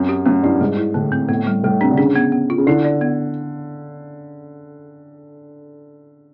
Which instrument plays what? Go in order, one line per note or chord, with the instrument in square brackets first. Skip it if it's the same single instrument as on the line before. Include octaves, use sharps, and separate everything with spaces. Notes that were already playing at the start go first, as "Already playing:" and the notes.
Already playing: [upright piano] F#2 [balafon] C4
[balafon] G4
[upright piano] F#2 [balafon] A3
[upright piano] G2 [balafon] E4
[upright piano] G#2 [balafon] G3
[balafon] E4
[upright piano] A2 [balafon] D3
[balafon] C4
[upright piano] A2 [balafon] B3
[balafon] G3
[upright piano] A2 [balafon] G3
[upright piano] C3 [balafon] D4
[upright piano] D3
[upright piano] C#3 [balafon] D4
[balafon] B3
B3
F4
[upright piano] C#3
[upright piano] D3 [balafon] E4
[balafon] D5
B3